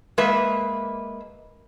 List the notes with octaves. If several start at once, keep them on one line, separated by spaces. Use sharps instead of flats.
G#3 A#3 B4 E5